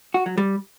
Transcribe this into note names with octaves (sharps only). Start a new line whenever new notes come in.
F#4
F#3
G3